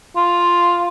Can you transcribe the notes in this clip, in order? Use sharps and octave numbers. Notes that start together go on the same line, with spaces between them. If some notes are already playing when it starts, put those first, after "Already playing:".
F4